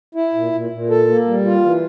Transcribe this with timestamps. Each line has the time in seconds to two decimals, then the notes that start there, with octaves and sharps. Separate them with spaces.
0.15 E4
0.34 A#2
0.52 A#2
0.71 A#2
0.90 A4
1.08 A#3
1.27 G3
1.46 F4
1.64 E3